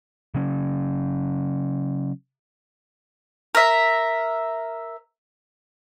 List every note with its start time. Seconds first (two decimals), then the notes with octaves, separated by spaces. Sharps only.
0.35 C#3 F#3 C#4
3.55 A#4 E5